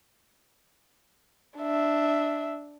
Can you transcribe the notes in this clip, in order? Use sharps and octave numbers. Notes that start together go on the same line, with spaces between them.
D4 E5